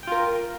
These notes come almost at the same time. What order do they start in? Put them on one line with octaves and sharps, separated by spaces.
G5 F4 A#4